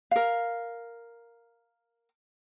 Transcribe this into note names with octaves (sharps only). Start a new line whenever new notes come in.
A#4 F5